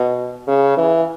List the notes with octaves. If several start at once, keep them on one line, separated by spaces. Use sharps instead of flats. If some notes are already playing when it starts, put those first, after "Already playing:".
Already playing: B2
C#3
E3